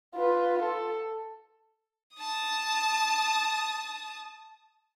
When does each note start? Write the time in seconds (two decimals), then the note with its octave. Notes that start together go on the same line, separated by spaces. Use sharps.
0.15 F4 B4
0.62 A4
2.17 A5 D#6